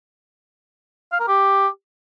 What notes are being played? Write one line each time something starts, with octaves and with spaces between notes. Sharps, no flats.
F5
A#4
G4